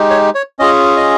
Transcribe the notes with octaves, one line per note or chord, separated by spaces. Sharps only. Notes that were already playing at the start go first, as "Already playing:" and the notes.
Already playing: G#3 D#4 G4
C#5
C#5
C#4 F4 G#4 D#5
D#5